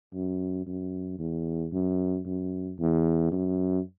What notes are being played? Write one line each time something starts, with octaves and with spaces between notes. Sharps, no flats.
F#2
F#2
E2
F#2
F#2
E2
F#2